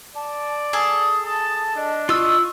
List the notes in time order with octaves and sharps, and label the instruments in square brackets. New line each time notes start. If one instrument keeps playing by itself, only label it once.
[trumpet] D5 [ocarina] A5
[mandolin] G#4 A4 [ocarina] D#6
[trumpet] A5 [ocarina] D#6
[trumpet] D4 [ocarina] D#5
[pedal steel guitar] F4 E6 [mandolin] D#5 [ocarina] C#6